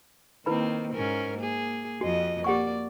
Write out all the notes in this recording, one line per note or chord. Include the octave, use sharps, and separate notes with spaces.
D#3 A#3 C4 E4 B4 B5
G#2 C#4 A#4
A#3 G#4
F2 F3 F#4 D#5
A#3 G4 D5 F#5 C#6